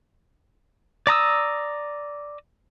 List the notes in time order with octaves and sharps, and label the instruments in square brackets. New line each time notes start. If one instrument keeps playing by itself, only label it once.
[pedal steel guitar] D5 A#5 D#6 E6